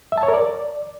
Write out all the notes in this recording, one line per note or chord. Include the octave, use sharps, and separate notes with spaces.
E5
A5
C#5
A#4
D5